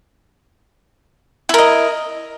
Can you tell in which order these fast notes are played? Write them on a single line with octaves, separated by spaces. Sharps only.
E4 A#4 D#5